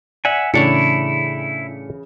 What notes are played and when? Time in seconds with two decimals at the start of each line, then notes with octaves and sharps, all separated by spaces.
0.25 D5 E5 F#5 G#5
0.54 A2 C#3 E3 D4 E4 C#5 C#7